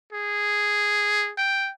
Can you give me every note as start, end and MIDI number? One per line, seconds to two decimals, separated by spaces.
0.12 1.32 68
1.38 1.70 79